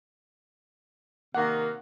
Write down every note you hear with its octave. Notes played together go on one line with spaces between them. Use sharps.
C3 D#3 A#3 F#5